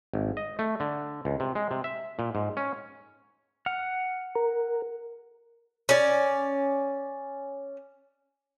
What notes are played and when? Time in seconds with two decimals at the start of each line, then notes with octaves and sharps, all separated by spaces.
0.13 G#1
0.37 D#5
0.59 A3
0.80 D3
1.25 C#2
1.40 C3
1.55 G#3
1.71 C3
1.84 E5
2.19 A#2
2.35 G#2
2.57 C#4
3.66 F#5 F6
4.35 A#4
5.89 C#4 D5